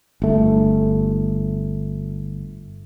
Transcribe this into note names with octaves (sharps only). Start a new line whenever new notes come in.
G1 A3